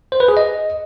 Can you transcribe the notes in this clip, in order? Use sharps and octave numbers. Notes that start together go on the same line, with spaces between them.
C5
B4
G#4
D#5